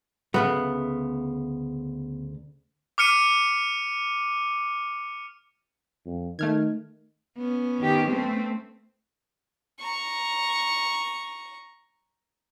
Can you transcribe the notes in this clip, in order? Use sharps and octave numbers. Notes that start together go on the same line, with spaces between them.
D2 C#3 A3 B3
D6 F6 C#7 D#7
F2
D#3 A3 F6 G#6
B3 C#4
D#3 G4
A3 C4
A#5 C#6